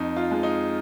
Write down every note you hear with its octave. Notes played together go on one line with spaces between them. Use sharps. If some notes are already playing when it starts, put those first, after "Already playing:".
Already playing: F2 D#4
F4
F3 G#3
D#4